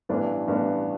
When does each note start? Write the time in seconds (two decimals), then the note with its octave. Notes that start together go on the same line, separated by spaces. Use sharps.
0.09 A1 G2 E3 B3 D4
0.47 A1 G2 E3 B3 D4